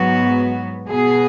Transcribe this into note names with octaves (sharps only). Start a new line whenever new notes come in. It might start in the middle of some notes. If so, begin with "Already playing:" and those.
Already playing: G#2 F#3 B3 F#4
B2 B3 G#4